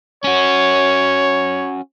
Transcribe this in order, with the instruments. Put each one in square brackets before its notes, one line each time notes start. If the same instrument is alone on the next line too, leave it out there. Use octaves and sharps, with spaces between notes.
[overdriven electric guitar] C#4 F#4 [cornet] C#5